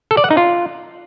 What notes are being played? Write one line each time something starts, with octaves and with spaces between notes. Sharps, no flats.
A4
D5
F#5
D#4
F4